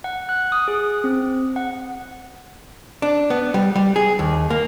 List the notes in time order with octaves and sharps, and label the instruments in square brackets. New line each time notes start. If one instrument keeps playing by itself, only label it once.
[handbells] F#5
F#6
D#6
G#4
C4
F#5
[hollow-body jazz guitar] D4
B3
G3
G3
G#4
D#2
A#3